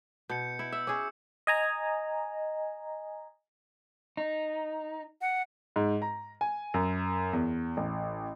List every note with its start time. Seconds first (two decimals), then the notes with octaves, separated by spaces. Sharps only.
0.30 B2 G6 C#7
0.59 E4
0.73 E5 E6
0.87 C#4 G#4 D6
1.47 D#5 G#5 A#5
4.17 D#4
5.21 F#5
5.76 G#2
6.02 A#5
6.41 G#5
6.74 F#2
7.33 E2
7.77 A1